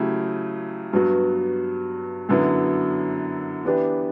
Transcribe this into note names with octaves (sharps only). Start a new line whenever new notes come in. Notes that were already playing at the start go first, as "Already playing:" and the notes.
Already playing: C#3 F#3 A3 E4 G4
G2 F#3 B3 F#4
F#2 D3 F#3 B3 E4
E3 B3 D4 G4 B4